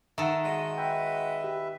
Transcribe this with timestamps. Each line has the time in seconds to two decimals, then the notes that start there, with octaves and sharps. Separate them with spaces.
0.18 D#3 A4 E5 F#5
0.43 G#3 F#4 D#5
0.78 B4 E5 G5
1.44 G4